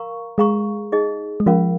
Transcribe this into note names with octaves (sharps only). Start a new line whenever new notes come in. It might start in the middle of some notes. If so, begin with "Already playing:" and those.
Already playing: A#4 F5 A#5 C#6
G#3 G#4 F5 A#5 C#6
D#4 G#4 D#5
G#3
F3 C#4 F4 A#4 F5